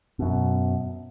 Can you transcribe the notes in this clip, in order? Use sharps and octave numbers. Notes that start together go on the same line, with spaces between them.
F#2 B2